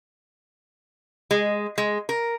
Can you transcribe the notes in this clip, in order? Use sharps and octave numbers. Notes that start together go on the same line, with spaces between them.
G#3
G#3
A#4